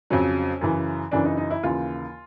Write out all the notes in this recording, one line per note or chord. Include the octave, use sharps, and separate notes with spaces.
F2 C#3 F#3 C#4
F#2 C#3 E3
F#2 C#3 E3 D4
D#4
D#4
E4
D#2 C#3 E3 F4